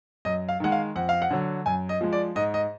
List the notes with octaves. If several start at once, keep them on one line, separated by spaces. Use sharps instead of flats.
F#2 D#5
F5
D#3 G#3 F#5
F5
F2 F#5
F5
F#5
D3 F#3
F#2 G#5
D#5
F3 G#3
D5
G#2 D#5
D#5